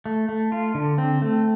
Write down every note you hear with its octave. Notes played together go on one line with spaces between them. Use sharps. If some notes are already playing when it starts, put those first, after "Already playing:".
A3
A3
F4
D3
C4
A3